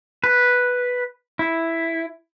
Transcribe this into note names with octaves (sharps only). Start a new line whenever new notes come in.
B4
E4